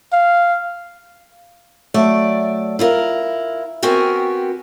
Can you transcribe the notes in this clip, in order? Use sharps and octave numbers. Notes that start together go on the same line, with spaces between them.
F5
F#3 A3 D5 E5
E4 F4 A#4
B3 C4 F#4 G4 A#4 G#5